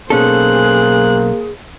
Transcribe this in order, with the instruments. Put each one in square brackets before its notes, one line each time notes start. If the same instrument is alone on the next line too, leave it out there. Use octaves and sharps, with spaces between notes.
[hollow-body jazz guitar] B1 C#4 A4 [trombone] A#3 [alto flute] G#4 [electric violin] C5 F#6